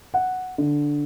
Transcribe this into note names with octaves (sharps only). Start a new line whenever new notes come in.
F#5
D3